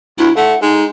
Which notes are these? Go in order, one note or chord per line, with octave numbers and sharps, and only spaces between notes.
D2 E4
A3 F#5
G#3 D#4